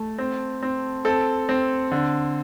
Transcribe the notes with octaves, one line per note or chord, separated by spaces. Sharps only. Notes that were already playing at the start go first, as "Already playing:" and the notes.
Already playing: A3
C4
C4
C4 A4
C4
D3